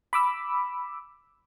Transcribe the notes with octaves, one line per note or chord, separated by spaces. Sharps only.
B5 D6 E6